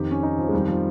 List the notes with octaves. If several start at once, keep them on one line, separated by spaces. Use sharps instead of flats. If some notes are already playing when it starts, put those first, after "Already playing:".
Already playing: F2 D#3 G4
C#4
D#4
F3
G#3
F2 D#3 G3
F3